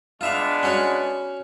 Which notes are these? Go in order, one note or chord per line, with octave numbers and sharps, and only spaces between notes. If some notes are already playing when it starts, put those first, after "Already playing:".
G#3 B3 D4 F4 E5 F5
C#4 F#4 C#5